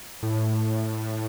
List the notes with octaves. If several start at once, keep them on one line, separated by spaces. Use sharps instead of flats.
A2